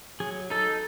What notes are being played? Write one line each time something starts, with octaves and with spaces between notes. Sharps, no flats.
F#3 G#4
D#4 A4